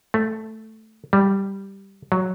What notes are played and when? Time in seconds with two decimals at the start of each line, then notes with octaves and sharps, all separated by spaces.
0.14 A3
1.13 G3
2.12 F#3